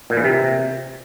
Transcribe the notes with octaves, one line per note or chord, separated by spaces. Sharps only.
A#2
E3
C3